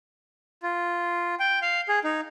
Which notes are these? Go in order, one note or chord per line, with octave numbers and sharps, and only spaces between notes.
F4
G5
F5
G#4
D#4